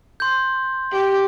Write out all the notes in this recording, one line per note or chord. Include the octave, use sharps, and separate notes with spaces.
C6 G6
G4